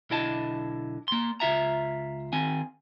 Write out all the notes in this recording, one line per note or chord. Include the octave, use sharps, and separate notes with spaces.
B1 D3 E4 D#5 A5
A#3 C6
C#2 F4 E5 A#5
D#3 C4 G#5